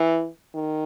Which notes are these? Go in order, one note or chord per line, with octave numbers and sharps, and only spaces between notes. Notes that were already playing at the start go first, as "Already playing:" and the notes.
Already playing: E3
D#3